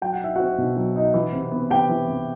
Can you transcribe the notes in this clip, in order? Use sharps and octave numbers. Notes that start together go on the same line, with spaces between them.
F#3 G5
F#5
D#4 E5
C4 F#4 F#5
B2
F#3
D#4
E3
C3
B3
C3 G4 G5
E3
C3